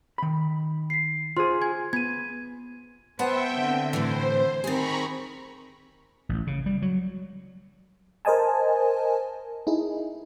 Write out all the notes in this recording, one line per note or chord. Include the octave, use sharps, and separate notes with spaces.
D#3 B5
B6 C7
F4 G#4 C5 C6
G#5 G#6
B3 G#6 D#7
B3 C5 E5 F#5 G5 A5
D3 C4
A2 E3 C5
D#3 C4 G#4 A#5 B5 C#6
A1
C#3
G3
F#3
A#4 C5 D#5 G#5 A5
D#4 E4 G#4